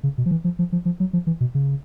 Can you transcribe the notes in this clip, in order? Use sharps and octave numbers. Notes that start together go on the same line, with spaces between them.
C#3
B2
F3
E3
F3
F3
F3
F3
F#3
F3
E3
B2
C#3